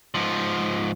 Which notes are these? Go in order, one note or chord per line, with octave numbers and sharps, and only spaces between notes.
G#2 F3